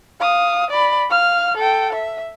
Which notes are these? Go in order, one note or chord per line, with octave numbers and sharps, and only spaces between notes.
F5 D#6
D5 B5
F5 F6
A4 G5
E5